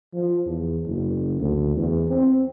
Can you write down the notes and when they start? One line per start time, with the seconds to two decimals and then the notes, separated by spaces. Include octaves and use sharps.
0.13 F3
0.46 E2
0.87 F#1
1.39 D2
1.76 E2
2.09 C4